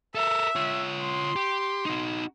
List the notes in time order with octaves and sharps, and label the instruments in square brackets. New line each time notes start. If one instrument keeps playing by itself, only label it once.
[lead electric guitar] A4 A#4 [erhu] E5
[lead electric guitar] F4 C#5
[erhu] C6
[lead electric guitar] G4
D#4 F#4